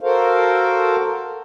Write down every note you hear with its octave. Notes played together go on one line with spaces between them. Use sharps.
F#4 A4 A#4 C5 F5